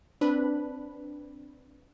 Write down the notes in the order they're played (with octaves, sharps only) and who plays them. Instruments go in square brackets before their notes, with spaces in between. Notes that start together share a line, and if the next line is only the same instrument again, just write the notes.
[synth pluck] C4 D4 B4 B5